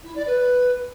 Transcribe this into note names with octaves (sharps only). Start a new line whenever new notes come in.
E4
D5
B4